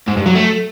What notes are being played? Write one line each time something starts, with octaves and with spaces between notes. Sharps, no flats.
G#2
G2
F#3
A3